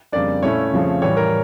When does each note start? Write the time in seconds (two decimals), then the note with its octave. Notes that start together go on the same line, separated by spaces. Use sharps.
0.12 F2 C#3 G3 A#3 D4 D5
0.42 A#2 A3 C#4 E4 C#5
0.72 F2 C#3 F3 A3
1.01 A2 E3 G3 C#5
1.17 A#4